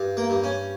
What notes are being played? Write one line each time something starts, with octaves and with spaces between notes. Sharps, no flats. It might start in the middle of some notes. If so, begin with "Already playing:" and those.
Already playing: G2
A#3
G2
C#4